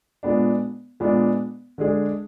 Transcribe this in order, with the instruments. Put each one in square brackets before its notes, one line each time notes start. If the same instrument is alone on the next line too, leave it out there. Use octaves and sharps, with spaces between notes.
[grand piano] A#2 G#3 B3 D4
A#2 G#3 B3 D4
D3 G#3 D4 G#4